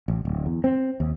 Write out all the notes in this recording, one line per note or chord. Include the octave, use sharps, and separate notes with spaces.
A1
D1
E2
C4
D#2